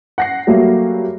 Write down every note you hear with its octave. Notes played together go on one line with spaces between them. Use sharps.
F#5 A#6 C7
F#3 G3 A3 A#3